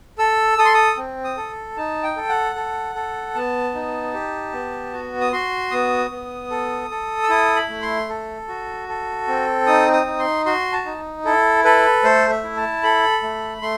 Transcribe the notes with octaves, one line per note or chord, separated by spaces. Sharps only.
A4 E6
A4 D#6
C6
D#6
C4
D#6
A4
D#4 A5
G5
A4
F#5
A4
A4
B3 A5
D#4
G4
B3
F#4
D#6
F#4 C6
B3 D#6
B3
A4
A4
E6
E4 D#6
B5
A3
C6
A4
F#4
A4
C4
D#4 D#6
D#6
D#4
C6
F#4 C6
A5
D#4
E4 A4
A4 B4
A3 C5
E5
E4
A5
A4 B5
A3
A3 C6